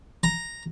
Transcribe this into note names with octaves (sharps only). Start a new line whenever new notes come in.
A#5